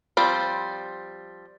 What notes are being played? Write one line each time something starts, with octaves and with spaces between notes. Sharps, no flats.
F3 G3 C4